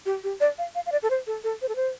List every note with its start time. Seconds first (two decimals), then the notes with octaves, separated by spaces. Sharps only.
0.06 G4
0.24 G4
0.41 D5
0.58 F5
0.75 F5
0.86 F5
0.92 D5
1.03 A4
1.10 C5
1.27 A4
1.44 A4
1.62 C5
1.69 A4
1.76 C5